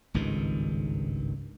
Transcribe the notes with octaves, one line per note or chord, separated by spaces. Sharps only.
G#1 C#2 G2 D#3